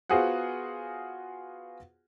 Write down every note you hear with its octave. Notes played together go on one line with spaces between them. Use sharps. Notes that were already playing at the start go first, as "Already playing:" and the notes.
B3 F4 F#4 G#4 C5 F#5